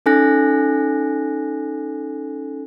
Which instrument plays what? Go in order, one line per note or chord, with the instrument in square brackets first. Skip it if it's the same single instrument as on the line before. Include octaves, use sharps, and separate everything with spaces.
[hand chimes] C#4 D#4 A4 G#5 F#6 A#6